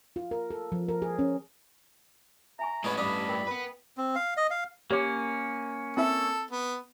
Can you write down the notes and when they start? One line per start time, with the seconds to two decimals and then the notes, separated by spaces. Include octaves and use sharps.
0.16 F4
0.31 A#4
0.51 A4
0.72 F3
0.88 A#4
1.02 G#4
1.19 C#4
2.59 E5 G#5 A#5 C#6
2.84 A2 G#3 B3 C#4 B4 D#5 B5
2.98 G2 D4 B5 D#6
3.29 A#4 G5
3.48 B3 B4
3.97 C4
4.15 F5
4.37 D#5
4.50 F5
4.91 A#3 C#4 G4 C#5 D6
5.97 C4 E4 A4 E5
6.51 B3